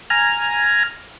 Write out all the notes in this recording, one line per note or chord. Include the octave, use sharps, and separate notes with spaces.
G#5 A#5 F6